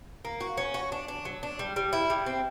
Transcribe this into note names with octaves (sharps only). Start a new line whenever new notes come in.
A#3
F#4
C#4
F#4
D4
D4
F#3
D4
G3
G3
E4
G3
C4